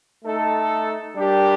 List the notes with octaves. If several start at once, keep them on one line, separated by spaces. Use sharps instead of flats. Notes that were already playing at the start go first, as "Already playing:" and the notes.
A3 D#4 A4
G3 D4 G4 A#4